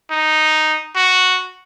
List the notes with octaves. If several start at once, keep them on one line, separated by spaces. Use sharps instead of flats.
D#4
F#4